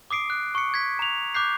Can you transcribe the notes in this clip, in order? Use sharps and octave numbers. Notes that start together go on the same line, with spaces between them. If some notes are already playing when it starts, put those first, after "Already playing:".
D6 D#6 C7 D7
F#6
C#6 C#7
G#6 B6
A#5 F7
D6 F#6 G6 C7